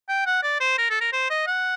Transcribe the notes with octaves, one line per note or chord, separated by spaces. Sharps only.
G5
F#5
D5
C5
A#4
A4
A#4
C5
D#5
F#5